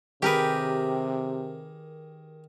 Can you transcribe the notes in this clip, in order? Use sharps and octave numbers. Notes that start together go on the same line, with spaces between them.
C3 D#3 G4 G#4 A#4 B4